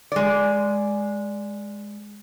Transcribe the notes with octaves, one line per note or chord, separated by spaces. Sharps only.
G#3 D5